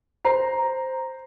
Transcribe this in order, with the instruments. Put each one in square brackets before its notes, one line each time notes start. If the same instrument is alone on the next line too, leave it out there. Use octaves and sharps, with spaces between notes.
[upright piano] C5 A#5 C7